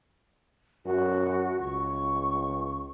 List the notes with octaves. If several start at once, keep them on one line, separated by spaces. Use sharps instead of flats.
F#2 F#4
C#2 C#6